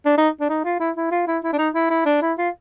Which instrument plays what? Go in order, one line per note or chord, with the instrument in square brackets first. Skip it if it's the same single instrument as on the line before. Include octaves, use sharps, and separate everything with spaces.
[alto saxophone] D4
D#4
D4
D#4
F4
E4
E4
F4
E4
E4
D4
D#4
E4
E4
D4
E4
F4